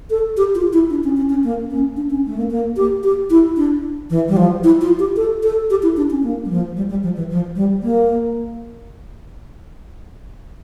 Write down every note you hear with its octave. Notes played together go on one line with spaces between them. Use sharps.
A4
G4
F4
E4
D4
C#4
C#4
C#4
A#3
C#4
D4
C#4
A3
A#3
A#3
G4
G4
E4
D4
E3
G3
F3
E4
F4
G4
A4
A4
G4
E4
D4
C#4
A#3
G3
F3
G3
G3
F3
E3
F3
G3
A#3